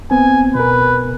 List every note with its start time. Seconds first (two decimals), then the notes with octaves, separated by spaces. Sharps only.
0.11 B3 C4 G#5
0.55 B2 A#4 B4